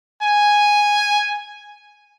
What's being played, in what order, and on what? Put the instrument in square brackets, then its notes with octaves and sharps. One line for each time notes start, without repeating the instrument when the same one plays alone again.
[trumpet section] G#5